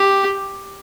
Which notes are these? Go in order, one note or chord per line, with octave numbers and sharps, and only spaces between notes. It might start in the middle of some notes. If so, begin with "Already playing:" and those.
Already playing: G4